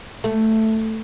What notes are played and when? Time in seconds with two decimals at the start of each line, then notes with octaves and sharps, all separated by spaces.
0.24 A3